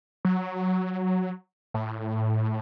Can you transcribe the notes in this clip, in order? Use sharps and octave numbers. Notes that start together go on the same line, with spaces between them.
F#3
A2